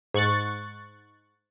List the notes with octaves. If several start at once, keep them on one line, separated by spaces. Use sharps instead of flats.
G#2 C#6 F#6 A6